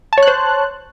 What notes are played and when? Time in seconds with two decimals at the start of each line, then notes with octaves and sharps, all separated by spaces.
0.13 A5
0.18 C#5
0.23 F#6
0.28 C5